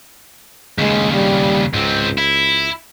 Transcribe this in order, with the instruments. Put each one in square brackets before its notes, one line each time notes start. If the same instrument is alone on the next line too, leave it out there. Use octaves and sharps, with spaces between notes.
[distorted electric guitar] D#2 C#3 [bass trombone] G#3
[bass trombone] G3
[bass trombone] C#2 [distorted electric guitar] G#2 C4
[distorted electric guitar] E4